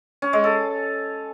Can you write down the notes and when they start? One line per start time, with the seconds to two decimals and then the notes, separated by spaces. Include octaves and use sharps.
0.22 C#4
0.33 G#3
0.44 A4